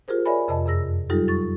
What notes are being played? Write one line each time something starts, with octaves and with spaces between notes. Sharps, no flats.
F4 G4 G#4 A#4 C5
A#4 C#5 D5 E5 G#5 B5
F2 C3 D#5 A5
F#2 G#4 E6 A#6
F#3 G3 D#4 F4 G4 A4
C#6 A6